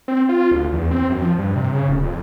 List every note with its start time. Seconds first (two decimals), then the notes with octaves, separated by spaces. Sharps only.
0.08 C4
0.29 F4
0.52 D2
0.73 E2
0.91 C4
1.10 F#2
1.22 F3
1.39 G2
1.56 C3
1.72 C#3
1.89 D1
2.03 F2